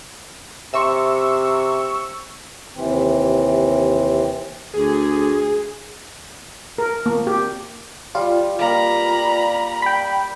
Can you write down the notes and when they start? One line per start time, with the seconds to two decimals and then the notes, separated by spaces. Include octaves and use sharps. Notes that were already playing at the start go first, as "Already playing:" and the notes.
0.74 C3 E5 C6 C#6 E6
2.75 D#2 C3 E3 C4
4.74 D2 G#4
6.78 A#4
7.06 A#3
7.27 G4
8.15 G3 F4
8.59 G3 A#3 A#5 B5
9.82 G5 B5